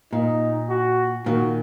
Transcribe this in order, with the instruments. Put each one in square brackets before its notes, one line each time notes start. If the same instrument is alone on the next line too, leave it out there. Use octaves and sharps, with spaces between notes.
[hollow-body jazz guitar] A#2 [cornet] D#4
[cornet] F#4
[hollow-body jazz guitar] A#2 D#3 [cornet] F#4